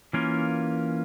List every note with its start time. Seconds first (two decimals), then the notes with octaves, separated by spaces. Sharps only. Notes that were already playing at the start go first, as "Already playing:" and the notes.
0.13 E3 A#3 C#4 F4 A#4